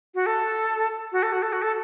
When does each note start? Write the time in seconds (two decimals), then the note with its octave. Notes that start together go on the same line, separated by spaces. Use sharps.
0.15 F#4
0.26 A4
1.12 F#4
1.23 A4
1.32 F#4
1.42 A4
1.53 F#4
1.62 A4